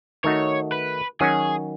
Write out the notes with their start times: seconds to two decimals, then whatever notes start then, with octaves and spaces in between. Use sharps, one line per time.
0.24 D#3 A3 D#4 F#4 C#5
0.72 B4
1.20 D#3 F#3 C#4 F#4 G#4